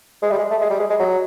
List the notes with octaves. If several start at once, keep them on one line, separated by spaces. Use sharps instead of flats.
G#3
G3
G#3
A3
G#3
G3
G#3
G#3
F#3